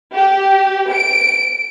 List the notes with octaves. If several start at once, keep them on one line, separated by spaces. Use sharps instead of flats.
G4
D7